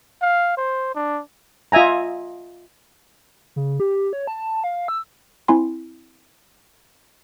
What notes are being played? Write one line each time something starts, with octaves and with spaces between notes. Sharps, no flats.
F5
C5
D4
F4 D#5 E5 G#5 A#5
C#3
G4
C#5
A5
F5
E6
C4 E4 G#5 C6